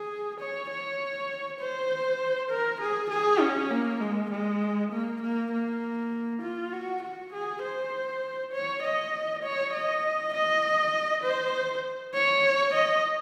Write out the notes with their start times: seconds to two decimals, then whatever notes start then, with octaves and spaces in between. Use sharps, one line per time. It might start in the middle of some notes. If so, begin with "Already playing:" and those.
Already playing: G#4
0.40 C#5
0.70 C#5
1.60 C5
2.50 A#4
2.81 G#4
3.10 G#4
3.40 C#4
3.71 A#3
4.00 G#3
4.31 G#3
4.92 A#3
5.22 A#3
5.52 A#3
6.42 F4
6.72 F#4
7.02 F#4
7.32 G#4
7.62 C5
8.53 C#5
8.82 D#5
9.43 C#5
9.74 D#5
10.34 D#5
11.23 C5
12.14 C#5
12.74 D#5